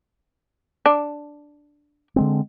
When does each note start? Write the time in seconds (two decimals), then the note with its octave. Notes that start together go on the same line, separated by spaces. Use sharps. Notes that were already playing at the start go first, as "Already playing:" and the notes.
0.86 D4
2.16 D3 G#3 C4